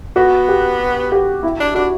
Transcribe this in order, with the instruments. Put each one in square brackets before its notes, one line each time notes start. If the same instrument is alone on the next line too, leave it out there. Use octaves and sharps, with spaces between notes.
[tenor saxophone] B3 [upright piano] F#4
[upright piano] G4
G4
E4
[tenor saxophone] D4
[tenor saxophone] D4 [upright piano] F#4